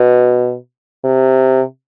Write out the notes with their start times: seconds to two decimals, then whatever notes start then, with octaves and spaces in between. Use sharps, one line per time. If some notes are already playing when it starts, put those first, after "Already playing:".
Already playing: B2
1.04 C3